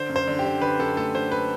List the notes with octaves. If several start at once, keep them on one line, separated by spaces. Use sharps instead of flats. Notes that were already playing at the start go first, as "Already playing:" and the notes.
Already playing: D3 C5
F#2
C5
D3
G4
D3
D3 B4
F#2 A4
A3 A4
D3 C5
B4